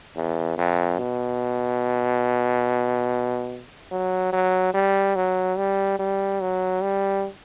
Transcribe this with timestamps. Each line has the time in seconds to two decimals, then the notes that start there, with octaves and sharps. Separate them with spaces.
0.16 E2
0.58 F2
0.99 B2
3.91 F#3
4.32 F#3
4.74 G3
5.16 F#3
5.57 G3
5.99 G3
6.41 F#3
6.82 G3